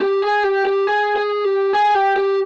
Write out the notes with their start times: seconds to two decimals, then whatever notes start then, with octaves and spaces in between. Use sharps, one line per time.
0.01 G4
0.22 G#4
0.43 G4
0.65 G4
0.87 G#4
1.16 G#4
1.44 G4
1.73 G#4
1.94 G4
2.16 G4